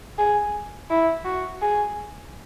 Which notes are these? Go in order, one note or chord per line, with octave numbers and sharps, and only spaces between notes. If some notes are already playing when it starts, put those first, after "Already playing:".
G#4
E4
F#4
G#4